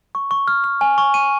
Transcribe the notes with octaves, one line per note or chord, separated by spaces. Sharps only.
C#6
C#6
F6
F6
G#5
C#6
D#7